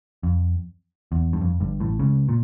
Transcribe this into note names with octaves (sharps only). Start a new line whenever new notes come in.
F2
E2
G2
F2
G1 G2
A1 A2
C#2 C#3
A#2